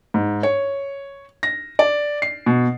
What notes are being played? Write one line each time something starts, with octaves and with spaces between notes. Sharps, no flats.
G#2
C#5
A#6
D5
C7
B2